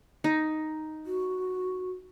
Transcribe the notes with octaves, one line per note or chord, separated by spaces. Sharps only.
D#4
F#4